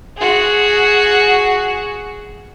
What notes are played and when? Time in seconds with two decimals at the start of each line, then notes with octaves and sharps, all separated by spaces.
0.18 F#4 G#4